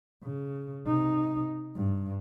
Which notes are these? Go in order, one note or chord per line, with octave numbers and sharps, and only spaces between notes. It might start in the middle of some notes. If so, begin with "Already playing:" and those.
C#3
C3 D#4
G2